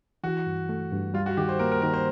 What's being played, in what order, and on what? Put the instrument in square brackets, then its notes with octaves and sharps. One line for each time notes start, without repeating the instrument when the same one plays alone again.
[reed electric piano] E3 [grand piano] F#4
[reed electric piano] G2
A3
G2
[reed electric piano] G3 [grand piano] F4
[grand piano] F#4
[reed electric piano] D#3 [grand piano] G4
[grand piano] C5
[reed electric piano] A#3 [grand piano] A#4
[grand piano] A#4
[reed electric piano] D#3 [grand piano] A#4
[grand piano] C5